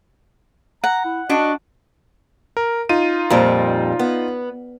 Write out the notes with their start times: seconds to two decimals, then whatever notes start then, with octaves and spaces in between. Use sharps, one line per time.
0.84 F#5 A#5
1.05 E4
1.29 D4 F#4 D#5
2.57 A#4
2.89 D#4 F4 D#7
3.30 F2 A#2 G3
3.99 B3